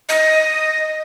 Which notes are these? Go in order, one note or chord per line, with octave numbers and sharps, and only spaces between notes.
D#5